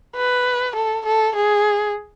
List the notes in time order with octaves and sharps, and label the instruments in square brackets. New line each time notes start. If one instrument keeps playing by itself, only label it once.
[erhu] B4
A4
A4
G#4